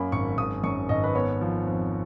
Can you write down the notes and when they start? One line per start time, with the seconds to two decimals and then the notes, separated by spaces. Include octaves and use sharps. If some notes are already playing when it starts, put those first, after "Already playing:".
Already playing: F#2 A#3 B5
0.12 G#1 C#6
0.38 G#1 D#6
0.64 F#2 C#6
0.89 G#1 D#5
1.04 B4
1.15 B3 C#5
1.41 F3
1.67 F2